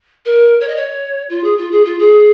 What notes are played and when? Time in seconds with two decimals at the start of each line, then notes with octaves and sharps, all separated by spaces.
0.25 A#4
0.61 C#5
0.68 D#5
0.76 C#5
1.30 F4
1.44 G#4
1.57 F4
1.71 G#4
1.85 F4
1.99 G#4